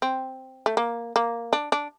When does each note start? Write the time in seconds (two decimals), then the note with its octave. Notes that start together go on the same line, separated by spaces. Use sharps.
0.02 C4
0.66 A3
0.77 A#3
1.16 A#3
1.53 D4
1.72 D4